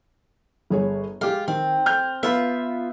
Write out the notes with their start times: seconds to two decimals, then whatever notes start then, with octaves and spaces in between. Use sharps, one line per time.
0.70 G1 G#4 C#5
1.21 G#3 F4 G4
1.48 D#3 C4
1.86 F6 G6
2.23 B3 F4 E5 B5